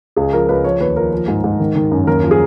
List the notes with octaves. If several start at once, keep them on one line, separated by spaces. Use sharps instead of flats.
C#2 G#4
F3 A#4
C#2 B4
F3 C#5
D#2 B4
F3 A#4
F3
G#2
G#2
D#3
D#3
F#2
D#2 A#4
F3
G#4